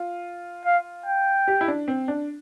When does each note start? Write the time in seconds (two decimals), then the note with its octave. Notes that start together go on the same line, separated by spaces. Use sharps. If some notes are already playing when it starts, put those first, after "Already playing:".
Already playing: F4
0.66 F5
1.06 G5
1.48 G4
1.61 E4
1.68 D4
1.88 C4
2.08 D4